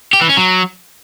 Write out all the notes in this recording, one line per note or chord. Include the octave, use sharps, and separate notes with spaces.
G4
E3
C#4
F#3